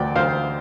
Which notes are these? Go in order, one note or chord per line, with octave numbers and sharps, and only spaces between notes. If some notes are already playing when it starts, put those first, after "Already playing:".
Already playing: D2 D3 D5 G5
D2 C5 F5